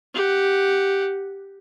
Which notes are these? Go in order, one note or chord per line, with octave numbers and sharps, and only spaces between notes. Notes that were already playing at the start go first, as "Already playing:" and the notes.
G4 F#5